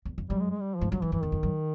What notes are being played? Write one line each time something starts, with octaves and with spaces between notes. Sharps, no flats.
E2
F2
F#2 G3
G#3
G#3
G3
F3
G#2
G2 F#3
F#2 E3
F#2 E3
E2 D#3
F2
F#2